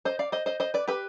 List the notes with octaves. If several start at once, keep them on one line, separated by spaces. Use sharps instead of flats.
C5 D#5
D5 F5
C5 D#5
C5 D#5
C5 D#5
B4 D5
G4 B4